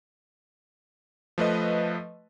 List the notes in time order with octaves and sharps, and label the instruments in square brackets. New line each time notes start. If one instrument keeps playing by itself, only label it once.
[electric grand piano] F3 A3 B4 D#5